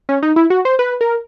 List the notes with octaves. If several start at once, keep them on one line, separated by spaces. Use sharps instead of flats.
C#4
D#4
E4
F#4
C5
B4
A#4